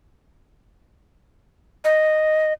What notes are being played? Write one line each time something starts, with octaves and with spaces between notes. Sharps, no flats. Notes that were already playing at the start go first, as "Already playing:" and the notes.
D#5